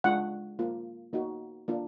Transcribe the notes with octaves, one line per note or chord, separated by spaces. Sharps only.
G#3 D4 F4 F#5
A#3 F4
A#3 D#4 F#4
A#3 D4 F4